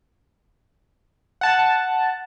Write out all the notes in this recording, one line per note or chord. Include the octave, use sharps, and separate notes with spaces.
F#5 A5